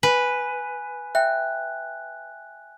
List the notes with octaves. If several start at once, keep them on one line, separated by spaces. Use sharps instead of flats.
B4 G#5 F#6
E5 G5 F#6